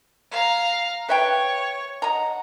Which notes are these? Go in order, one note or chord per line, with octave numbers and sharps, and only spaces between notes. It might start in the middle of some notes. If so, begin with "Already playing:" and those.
F5 A#5
B4 C#5 E5 G5
D#5 F#5 A#5